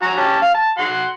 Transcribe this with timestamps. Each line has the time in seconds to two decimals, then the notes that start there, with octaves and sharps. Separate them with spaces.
0.02 F#4 G#5 A#5
0.17 C#4 G4 A5
0.42 F5
0.54 A5
0.78 F#4 F#5 C6